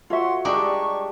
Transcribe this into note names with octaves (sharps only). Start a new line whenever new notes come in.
A3 F4 F#4 C#5 E5 F#5 C6
G3 G#3 D4 G4 D#5 A#5 C#6